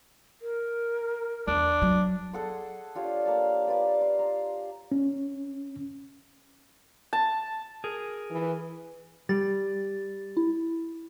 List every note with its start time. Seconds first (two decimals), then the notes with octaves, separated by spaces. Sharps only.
0.41 A#4
1.48 E2 D4
1.82 F#3
2.33 G#4 A4 F#5 C6
2.95 D4 F4 G4 C#5
3.25 A#3 A5
3.67 F4 B4 D5
4.01 C6
4.19 A#5 C6
4.92 C#4
7.13 A5
7.84 G#4 A#4
8.31 E3
9.29 G3 A6
10.37 E4